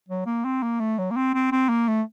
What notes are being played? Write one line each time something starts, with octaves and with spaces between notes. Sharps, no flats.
F#3
A#3
C4
A#3
A3
F#3
A#3
C4
C4
C4
A#3
A3